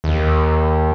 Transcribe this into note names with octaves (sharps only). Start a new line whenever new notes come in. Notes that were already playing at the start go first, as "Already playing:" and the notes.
D#2